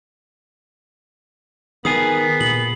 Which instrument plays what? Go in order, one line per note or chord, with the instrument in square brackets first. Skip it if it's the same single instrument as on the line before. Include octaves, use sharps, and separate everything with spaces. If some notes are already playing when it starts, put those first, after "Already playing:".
[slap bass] D#3 [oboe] B3 [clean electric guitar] G#4 A#4 G#5 [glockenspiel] D#6 C7
[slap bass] A#2 [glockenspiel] F#7